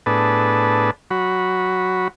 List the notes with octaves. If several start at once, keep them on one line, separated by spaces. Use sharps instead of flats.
A2 B3 D4 G#4 B4 A5
F#3 F#4 B5